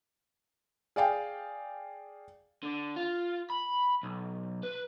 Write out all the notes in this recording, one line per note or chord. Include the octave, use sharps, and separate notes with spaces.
G#4 D5 F5 G5
D3
F4
B5
B1
B4